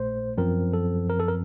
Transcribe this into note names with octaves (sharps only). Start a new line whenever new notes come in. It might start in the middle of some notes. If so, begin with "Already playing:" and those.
Already playing: A#1 A#2 A3 C5
F#2 F3 C4 A#4
A4
A#4
A4
A#4